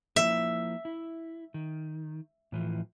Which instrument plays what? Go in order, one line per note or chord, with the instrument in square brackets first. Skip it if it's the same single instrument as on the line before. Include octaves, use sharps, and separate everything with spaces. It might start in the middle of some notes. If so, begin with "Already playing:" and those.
[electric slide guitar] F3 A#3 E4 [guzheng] E5
[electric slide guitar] E4
D#3
A2 E3 F3